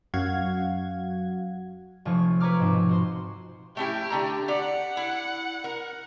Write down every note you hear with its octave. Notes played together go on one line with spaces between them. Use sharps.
F#2 F#4 F5 F#5 G#6
F1 F3 C#5 C#6
B4 C#5 A#5 D6 F6
G#2 B2 C4
F#4 C5 C6
A3 C#4 E4 G4
D3 A3 A#5
G4 D5 F#5
E4
A#4